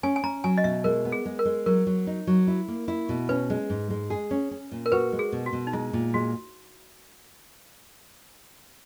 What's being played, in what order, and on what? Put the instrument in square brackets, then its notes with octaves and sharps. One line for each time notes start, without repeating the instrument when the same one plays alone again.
[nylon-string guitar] C#4 [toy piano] G#5
[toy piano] G#5
[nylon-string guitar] C#4 [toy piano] A#5
[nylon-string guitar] F#3 [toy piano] G#5
[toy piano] D#5
[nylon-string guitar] B2 [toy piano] E5
[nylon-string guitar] G#3 [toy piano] A#4
[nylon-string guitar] B3
[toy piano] G#4
[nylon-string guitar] G#3
[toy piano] A#4
[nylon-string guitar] G#3
[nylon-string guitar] F#3 [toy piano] A#4
[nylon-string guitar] F#3
D#4
F#3
E4
A#3
E4
B2
[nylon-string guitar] C#4 [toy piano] B4
[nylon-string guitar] G#3
G#2
G#3
G#4
C#4
C#4
A#2
[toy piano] A#4
[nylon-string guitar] F#4 [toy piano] B4
[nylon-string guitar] G#3
[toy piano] G#4
[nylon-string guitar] B2
[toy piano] F#4
[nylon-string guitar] B2
[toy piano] D#4
[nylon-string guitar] G#3 [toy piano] E4
[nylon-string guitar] A#2
[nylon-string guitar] G#3 [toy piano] F#4